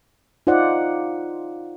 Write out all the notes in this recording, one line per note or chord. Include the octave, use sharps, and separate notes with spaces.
D#4 F4 C5 D5 F#5